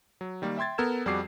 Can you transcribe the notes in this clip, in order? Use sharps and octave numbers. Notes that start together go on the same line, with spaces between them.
F#3
D#3 G3 A#3
E5 G5 C6 G#6 A6
B3 A4 A#4 E6 G#6 E7
F2 G3 F#4 G#4 D6 C7